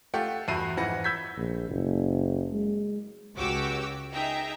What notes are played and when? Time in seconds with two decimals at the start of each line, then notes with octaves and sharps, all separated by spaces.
0.14 A3 F4 G4 F#5
0.48 E2 G2 F#4 E5 C7 D#7
0.77 F2 G#2 E3 F#5 B5 A#6
1.04 B5 E6 G6 G#6 B6
1.37 A#1
1.69 F#1
2.53 G#3
3.36 C#2 F#4 G4 C#5 D6 E6
4.13 D#4 G#4 E5 G5 A#5